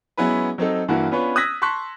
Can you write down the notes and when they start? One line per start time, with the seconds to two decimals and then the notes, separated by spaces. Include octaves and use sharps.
0.17 F#3 G#3 B3 C#4 E4 B4
0.58 F#3 C4 D#4 A4
0.88 G2 E3 A#3 E4 F#4 F#5
1.11 B3 C#4 D4 F4 B4 C#5
1.36 D#6 E6 F#6 G#6 A#6 B6
1.62 A5 C6 C#6 F#6 B6